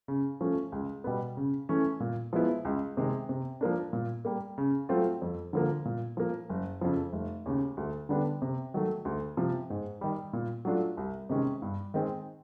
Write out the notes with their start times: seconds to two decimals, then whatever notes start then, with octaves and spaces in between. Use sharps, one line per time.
0.08 C#3
0.41 F3 A3 C#4
0.72 C#2
1.04 B2 G3 B3
1.37 C#3
1.69 E3 A3 C#4
2.00 A#2
2.33 F3 G#3 B3 E4
2.65 C#2
2.97 C3 D#3 G#3
3.29 C3
3.61 F3 A#3 D4
3.93 A#2
4.25 G3 A#3
4.58 C#3
4.89 F#3 A3 C4 F4
5.22 F2
5.53 D3 F3 A#3
5.85 A#2
6.17 F3 A#3
6.49 F#1
6.81 F2 C#3 F3
7.13 F1
7.46 D#2 C#3
7.77 D2
8.09 D3 G3 B3 D4
8.42 C3
8.74 D#3 F#3 A3
9.05 D2
9.37 C3 F3
9.70 G#2
10.01 D#3 G3
10.33 A#2
10.65 F#3 A3 D4 F4
10.97 C2
11.29 C3 D#3 G#3 C#4
11.62 G2
11.94 D#3 G#3 C4